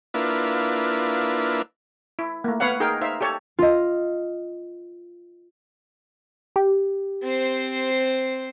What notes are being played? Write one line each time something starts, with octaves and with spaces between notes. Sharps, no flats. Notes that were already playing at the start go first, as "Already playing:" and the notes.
A#3 D4 E4 F4 B4
E4
A3 A#3
B3 B4 C#5 F5 F#5
D#4 G#4 A#4 G5
D#4 C5 E5 F5
G4 A4 C#5 A5
F4 D#5
G4
C4 C5